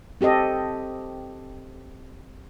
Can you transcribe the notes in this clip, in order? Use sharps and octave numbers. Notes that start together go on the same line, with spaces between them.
C4 G4 A4 D#5